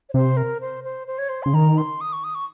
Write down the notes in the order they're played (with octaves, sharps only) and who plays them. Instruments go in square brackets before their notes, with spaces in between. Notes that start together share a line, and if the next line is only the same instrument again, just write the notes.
[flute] C#5
[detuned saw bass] C3 [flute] C5
[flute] A#4
C5
C5
C5
C#5
C5
[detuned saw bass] C#3 [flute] C6
[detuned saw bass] D#3 [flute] A#5
[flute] C6
D#6
C#6
D#6
C#6